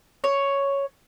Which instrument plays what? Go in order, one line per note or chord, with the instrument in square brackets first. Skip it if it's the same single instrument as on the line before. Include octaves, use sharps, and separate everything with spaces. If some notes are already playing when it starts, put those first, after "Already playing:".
[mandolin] C#5